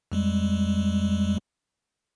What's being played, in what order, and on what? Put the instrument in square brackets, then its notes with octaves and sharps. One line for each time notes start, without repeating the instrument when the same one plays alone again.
[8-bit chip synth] F2 G3 G#3